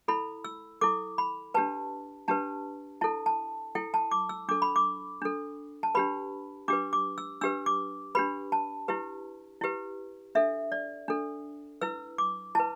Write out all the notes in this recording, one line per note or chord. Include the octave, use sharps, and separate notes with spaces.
E4 A4 B5
E6
E4 A4 D6
B5
D4 G4 B4 A5
D4 G4 B4 A5
E4 A4 A5
A5
E4 A4 G5
A5
D6
E6
D4 A4 D6
B5
D6
D4 A4
A5
D4 G4 B4 B5
D4 G4 B4 D6
D6
E6
D4 G4 B4 E6
D6
D4 G4 B4 B5
A5
E4 G4 B4
E4 G4 B4
D4 A4 E5
D5
D4 A4
E4 B4 E6
D6
E4 B4 A5